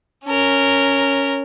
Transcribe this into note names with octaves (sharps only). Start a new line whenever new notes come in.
C#4 A#4